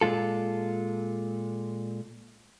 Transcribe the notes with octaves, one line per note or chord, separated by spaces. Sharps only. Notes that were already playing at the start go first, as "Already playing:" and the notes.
A#2 G#3 F4 A4